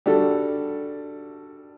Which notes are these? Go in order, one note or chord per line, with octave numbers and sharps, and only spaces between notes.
G3 D4 F#4 A4